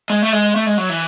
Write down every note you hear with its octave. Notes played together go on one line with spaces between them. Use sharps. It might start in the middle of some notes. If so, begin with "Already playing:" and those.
G#3
A3
G#3
A3
G#3
F#3
E3